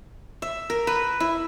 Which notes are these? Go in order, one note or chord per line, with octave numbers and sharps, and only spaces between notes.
E5
A#4
B4
E4